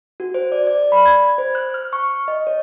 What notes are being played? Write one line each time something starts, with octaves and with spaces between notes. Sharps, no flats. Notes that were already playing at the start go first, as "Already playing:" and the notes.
F#4
C5
D5
D5
B5
G#6
C5
F#6
F6
C#6
D#5
C#5